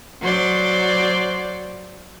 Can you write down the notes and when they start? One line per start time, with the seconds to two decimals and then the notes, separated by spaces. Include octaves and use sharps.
0.21 F#3 C5 D5